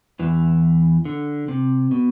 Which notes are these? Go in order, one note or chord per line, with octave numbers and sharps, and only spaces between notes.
E2 E3
D3
C3
B2